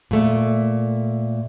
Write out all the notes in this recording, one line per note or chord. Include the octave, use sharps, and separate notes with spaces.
A#2 A3